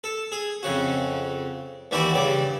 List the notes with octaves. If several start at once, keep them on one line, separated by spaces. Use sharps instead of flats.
A4
G#4
F2 C#3 F#4
D#2 E3 G3 E4 F#4 D5
G2 C#3 D5